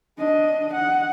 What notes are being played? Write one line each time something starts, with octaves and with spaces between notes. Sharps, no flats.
D4 D#5
F#5